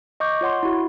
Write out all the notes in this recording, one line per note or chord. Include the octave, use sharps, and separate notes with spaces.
D#5 C#6 D6 G6
F4 C#5 F#5 C6
E4 F#4